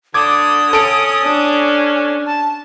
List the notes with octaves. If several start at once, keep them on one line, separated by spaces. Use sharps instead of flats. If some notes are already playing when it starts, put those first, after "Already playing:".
D3 D6 D#6 G#6
C#4 A4 D7
D4
A5